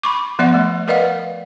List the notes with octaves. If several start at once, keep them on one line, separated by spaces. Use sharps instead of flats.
B5 C#6 D6
F3 B3 D5 E5 F#5
A3
A#4 B4 D5 D#5 F5 F#5